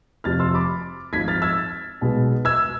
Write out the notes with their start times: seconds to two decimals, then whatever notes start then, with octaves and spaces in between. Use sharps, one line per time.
0.24 F1 F2 C3 F3 F6 A6
0.40 C6 E6
0.54 B5 D6
1.13 G#1 G#2 F3 G#6 B6
1.28 F6 A6
1.42 E6 G#6
2.01 B1 B2 G#3 B3
2.45 E6 G#6